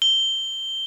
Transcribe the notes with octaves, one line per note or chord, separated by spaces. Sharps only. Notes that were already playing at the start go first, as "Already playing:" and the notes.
G7